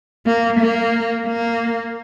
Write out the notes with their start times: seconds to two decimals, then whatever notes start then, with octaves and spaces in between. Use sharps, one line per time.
0.26 A#3
0.60 A#3
1.27 A#3